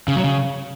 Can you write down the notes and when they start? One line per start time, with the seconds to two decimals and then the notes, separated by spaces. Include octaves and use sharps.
0.08 C#3
0.16 F#3
0.24 C#3